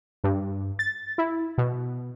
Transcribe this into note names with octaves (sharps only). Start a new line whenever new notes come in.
G2
A6
E4
B2